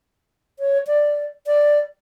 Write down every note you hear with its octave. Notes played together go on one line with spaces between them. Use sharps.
C#5
D5
D5